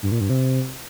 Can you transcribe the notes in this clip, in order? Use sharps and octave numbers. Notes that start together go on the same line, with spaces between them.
G2
A#2
G2
C3